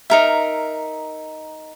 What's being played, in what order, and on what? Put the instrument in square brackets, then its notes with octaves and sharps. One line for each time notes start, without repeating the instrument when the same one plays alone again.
[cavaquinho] D#4 A#4 E5